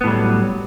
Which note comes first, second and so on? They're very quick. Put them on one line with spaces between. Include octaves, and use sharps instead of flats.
B3 A2 G3 F#3